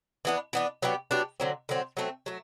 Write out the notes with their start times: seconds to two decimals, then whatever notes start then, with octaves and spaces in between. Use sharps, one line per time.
0.25 E3 B3 D4
0.53 E3 B3 D4
0.82 F#3 B3 D4 G4
1.11 F#3 B3 D4 G4
1.40 D3 F#3 C4
1.69 D3 F#3 C4
1.97 F#3 A3 C4
2.26 F#3 A3